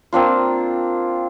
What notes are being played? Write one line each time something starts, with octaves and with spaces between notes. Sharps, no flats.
A#3 C4 D4 F4